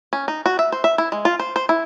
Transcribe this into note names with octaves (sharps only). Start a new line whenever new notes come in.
C#4
D#4
F#4
E5
C5
E5
E4
G#3
F4
C5
C5
E4